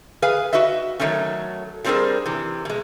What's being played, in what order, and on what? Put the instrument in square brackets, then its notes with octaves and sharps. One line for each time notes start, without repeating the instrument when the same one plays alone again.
[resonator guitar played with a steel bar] G#4 B4 F5 G#5
F#4 B4 D#5 E5
D#3 F3 F#3 A3 C#4
F#3 G3 C4 D4 G#4 A#4
C3 E3
B2 G#3